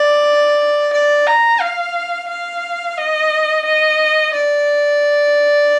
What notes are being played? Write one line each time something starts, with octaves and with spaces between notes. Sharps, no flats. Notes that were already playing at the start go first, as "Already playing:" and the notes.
Already playing: D5
D5
A#5
F5
F5
D#5
D#5
D5